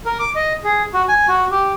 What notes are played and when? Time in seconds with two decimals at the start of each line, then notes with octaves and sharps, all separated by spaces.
0.06 A#4
0.19 D6
0.35 D#5
0.64 G#4
0.94 F#4
1.09 G#5
1.28 F#4
1.51 G4